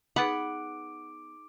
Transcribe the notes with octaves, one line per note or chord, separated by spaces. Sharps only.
B3 D#4 G#4 F#5 B5 D6 D7